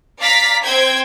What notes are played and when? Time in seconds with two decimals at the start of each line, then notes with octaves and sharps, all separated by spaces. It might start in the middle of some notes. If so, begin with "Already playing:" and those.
0.20 D5 F5 A#5 A6 B6
0.63 C4 C5 G5 G#6